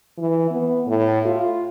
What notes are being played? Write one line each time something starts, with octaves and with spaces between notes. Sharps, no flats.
E3
B3
A2
F4